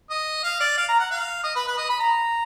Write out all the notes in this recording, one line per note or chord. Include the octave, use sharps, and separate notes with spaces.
D#5
F5
D5
F5
A#5
F#5
F5
D#5
B4
B4
D#5
B5
A#5